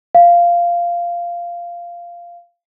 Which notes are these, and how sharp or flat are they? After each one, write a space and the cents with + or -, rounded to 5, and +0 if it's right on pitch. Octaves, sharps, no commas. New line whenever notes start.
F5 -10